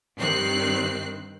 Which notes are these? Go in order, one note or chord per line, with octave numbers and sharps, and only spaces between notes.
G2 D#3 C4 F#6 C7